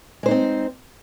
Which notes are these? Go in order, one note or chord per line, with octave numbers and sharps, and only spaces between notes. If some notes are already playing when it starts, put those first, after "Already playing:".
G#3 C4 D#4 C5